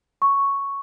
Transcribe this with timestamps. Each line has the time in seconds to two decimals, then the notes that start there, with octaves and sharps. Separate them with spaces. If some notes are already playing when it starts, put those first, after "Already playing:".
0.22 C#6